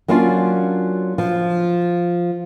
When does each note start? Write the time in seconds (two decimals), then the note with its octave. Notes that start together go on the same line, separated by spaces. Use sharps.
0.08 F#3 A#3 C#4 D4 F4
1.18 F3